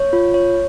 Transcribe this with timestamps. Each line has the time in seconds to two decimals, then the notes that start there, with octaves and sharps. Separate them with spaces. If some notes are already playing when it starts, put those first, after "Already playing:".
Already playing: C#5
0.13 F4
0.34 C#5